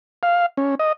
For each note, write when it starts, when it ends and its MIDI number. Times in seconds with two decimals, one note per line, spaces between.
0.23 0.46 77
0.57 0.75 61
0.79 0.92 75